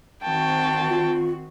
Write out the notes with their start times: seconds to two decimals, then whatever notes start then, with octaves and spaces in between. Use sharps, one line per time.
0.23 D#3 C4 F#4 G5 A5
0.90 F4